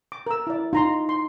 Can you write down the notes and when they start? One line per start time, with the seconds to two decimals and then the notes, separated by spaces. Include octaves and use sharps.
0.12 D6
0.26 A#4 E6
0.47 E4 D5
0.73 D#4 F4 A#5 C6
1.09 C6